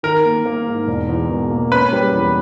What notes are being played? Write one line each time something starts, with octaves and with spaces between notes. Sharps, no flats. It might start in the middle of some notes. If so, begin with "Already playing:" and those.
D#3 A#4
A#3
A#3
G#2
E1
E2
B2
A#3
C#4 B4
G3
E2